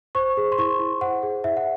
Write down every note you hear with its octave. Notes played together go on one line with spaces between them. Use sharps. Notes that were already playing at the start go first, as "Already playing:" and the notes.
C5 C#6
G#4
C6
E4 C#6
E4
C5 F#5
G#4
E4 E5
F#5